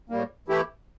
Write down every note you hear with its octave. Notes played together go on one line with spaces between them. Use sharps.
A2 G3 A#3
E3 A3 E4 G4